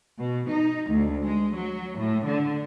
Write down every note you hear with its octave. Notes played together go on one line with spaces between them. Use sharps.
B2
D#4
D2
G#3
F#3
A2
D3